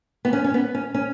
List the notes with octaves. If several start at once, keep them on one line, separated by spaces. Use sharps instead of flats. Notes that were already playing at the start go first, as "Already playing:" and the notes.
B3
C#4
C#4
B3
C#4
C#4